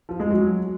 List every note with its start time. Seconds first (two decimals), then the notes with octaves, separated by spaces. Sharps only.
0.09 F3
0.20 G#3
0.30 F#3